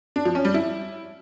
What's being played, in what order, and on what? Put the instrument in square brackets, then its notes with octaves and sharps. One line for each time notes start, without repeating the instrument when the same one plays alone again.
[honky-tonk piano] D4
F3
C#4
G3
E4